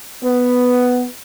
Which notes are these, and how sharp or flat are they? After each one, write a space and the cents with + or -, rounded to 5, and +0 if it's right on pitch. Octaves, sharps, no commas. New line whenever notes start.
B3 +5